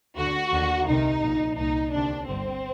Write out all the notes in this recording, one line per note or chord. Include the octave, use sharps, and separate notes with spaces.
D2 D3 F#4
D#2 D3
C2 C3 D#3 D#4
A#1 A#2
C2 A#2 D#4
D2 C3 D#3 D4
G1 G2 D3 C4